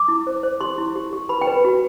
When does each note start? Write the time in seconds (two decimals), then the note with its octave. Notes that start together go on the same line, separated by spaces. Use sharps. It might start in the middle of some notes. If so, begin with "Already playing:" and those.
Already playing: D6
0.08 E4
0.27 C5
0.43 C5
0.61 G4 C6
0.78 E4
0.96 G4
1.13 G4
1.29 B4 B5
1.41 G5
1.47 B4
1.65 F#4